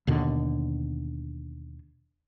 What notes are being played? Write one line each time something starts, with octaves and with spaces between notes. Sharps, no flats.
D#2 B2 D3